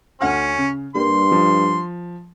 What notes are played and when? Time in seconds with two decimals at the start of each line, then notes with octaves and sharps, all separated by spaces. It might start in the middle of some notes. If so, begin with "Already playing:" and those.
0.21 D2 C#4 F#5 F6
0.58 C#3
0.95 G2 G3 A#3 C6
1.32 F3